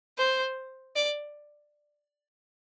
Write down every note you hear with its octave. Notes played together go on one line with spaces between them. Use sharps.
C5
D5